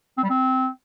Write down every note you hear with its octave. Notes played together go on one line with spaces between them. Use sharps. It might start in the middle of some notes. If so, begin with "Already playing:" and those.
C4
G3
C4